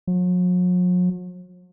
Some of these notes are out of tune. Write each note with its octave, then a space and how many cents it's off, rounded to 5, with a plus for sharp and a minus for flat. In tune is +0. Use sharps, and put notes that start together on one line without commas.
F#3 -45